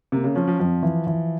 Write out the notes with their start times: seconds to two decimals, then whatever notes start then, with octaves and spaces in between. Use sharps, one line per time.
0.12 C3 A#3
0.24 C#3
0.35 F3 C#4
0.48 F3
0.59 F2 F3
0.83 E3
1.07 E3